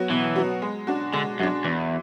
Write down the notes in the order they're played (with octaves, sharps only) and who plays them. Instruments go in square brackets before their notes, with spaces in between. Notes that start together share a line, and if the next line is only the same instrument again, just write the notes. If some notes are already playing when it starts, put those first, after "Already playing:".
Already playing: [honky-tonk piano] F#3 B3 F#4
[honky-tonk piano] B2 [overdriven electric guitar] E3
[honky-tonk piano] F#3 B3 F#4
G#3
D4 F#4
[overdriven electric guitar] D3 [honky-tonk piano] G#3
[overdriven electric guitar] F#2 [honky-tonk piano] F#4
[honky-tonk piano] D4
[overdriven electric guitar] E2 [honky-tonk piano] E3